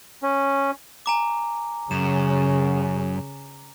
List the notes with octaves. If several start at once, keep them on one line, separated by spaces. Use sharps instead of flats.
C#4
G#5 A#5 D6
F#2 C#3 E7